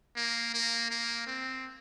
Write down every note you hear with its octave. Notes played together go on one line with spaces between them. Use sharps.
A#3
A#3
A#3
C4